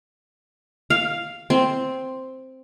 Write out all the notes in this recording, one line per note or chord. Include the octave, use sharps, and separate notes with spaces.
F5
C4